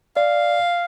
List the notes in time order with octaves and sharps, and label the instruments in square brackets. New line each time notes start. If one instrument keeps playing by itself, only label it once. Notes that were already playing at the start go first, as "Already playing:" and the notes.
[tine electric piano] D5 [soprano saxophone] F5